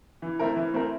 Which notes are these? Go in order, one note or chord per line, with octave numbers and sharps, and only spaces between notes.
E3
A3 C4 E4 A#4
E3
A3 C4 E4 A#4